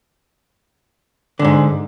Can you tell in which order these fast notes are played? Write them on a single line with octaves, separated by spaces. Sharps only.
D3 F2 G#2